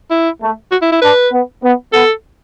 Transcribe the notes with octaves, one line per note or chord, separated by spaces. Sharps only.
E4
A3
F#4
E4
E4
D4 B4
B3
B3
B3 A4